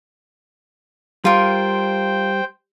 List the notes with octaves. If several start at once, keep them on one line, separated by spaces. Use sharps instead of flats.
G3 F4 A#4 C5 G5